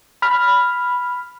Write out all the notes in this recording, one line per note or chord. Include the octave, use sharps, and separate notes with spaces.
B5 F6